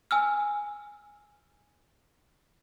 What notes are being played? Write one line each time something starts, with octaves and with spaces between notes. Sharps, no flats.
G#5 E6 F6